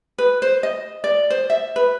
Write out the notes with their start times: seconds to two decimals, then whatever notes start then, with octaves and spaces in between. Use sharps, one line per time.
0.18 B4
0.42 C5
0.63 D#5
1.04 D5
1.30 C5
1.50 E5
1.76 B4